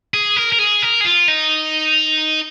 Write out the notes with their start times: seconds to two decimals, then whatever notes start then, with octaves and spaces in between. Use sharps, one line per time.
0.14 G#4
0.37 A#4
0.52 A#4
0.59 G#4
0.82 A#4
1.01 G#4
1.05 F4
1.28 D#4